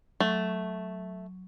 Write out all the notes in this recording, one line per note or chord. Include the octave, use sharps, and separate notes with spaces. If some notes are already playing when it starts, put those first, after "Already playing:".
F#3 A3